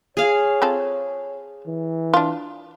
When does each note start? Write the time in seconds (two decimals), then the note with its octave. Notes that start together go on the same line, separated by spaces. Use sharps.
0.17 G#4 C#5 F5
0.62 C4 F4 A4
1.67 E3
2.14 D4 F4